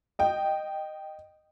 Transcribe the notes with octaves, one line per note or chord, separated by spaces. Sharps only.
D#5 G5